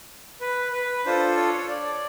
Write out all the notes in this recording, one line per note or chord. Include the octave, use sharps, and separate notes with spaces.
B4
B4
D4 F4 A4 C5
C#5
D5